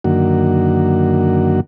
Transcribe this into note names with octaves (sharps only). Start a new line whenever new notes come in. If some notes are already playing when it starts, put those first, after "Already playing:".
F#2 D3 D#3 A#3 F#4